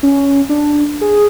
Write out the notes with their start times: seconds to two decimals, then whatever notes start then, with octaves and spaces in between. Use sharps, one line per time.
0.03 C#4
0.49 D4
1.01 G#4